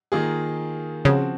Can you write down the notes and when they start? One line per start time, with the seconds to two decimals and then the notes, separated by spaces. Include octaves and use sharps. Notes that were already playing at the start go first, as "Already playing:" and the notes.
0.12 D#3 A#3 F4 G#4
1.05 C#3 F3 C4 F#4